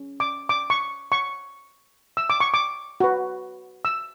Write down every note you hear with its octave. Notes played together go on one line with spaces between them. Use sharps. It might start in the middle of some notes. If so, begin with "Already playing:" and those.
Already playing: C#4
D6
D6
C#6
C#6
E6
D6
C#6
D6
F#4 B4
E6